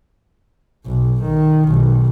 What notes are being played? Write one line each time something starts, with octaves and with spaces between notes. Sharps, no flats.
B1
D#3
B1